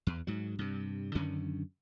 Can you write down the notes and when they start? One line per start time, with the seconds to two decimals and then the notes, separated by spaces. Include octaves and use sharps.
0.07 E2
0.27 G#2 F#3
0.59 G2 C3
1.15 F#2 D3 D#3 C#4